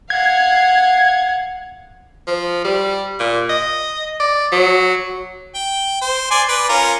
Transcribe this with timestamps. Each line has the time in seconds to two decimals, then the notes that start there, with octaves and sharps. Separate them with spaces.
0.10 F5 F#5 G#6
2.27 F3
2.65 G3
3.20 A#2
3.50 D#5
4.20 D5
4.52 F#3
5.55 G5
6.01 C5
6.31 D5 G#5 C6
6.48 B4 D5
6.69 C#4 F4 A#4